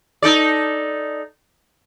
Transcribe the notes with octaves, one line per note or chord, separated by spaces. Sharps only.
D#4 A4 D5